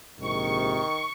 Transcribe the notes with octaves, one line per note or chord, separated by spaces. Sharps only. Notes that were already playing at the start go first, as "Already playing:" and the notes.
A#1 G#2 C3 D#3 C#6